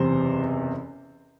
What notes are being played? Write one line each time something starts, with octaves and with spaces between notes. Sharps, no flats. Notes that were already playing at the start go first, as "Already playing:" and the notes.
Already playing: F#1 E2 C3 C5